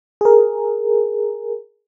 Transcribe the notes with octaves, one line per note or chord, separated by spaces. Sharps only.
G#4 A#4